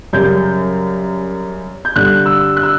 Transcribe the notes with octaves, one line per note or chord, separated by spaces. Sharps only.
F#2 C#3 G3 G6
G6
G2 D3 G3 F#6
E6
F#6
E6